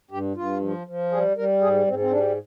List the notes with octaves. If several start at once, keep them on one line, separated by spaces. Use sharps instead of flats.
G2 G4
G2 F4
F3
F3
G3 G#4
G3 A#4
G#2 G#4
G#2 C4
C4
G3 D4